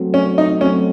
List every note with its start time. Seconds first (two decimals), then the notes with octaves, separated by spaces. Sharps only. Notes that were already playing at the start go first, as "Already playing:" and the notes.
Already playing: F#3 A3 C4 F#4
0.14 C#4
0.38 D#4
0.61 F#3 A3 C4 C#4 F#4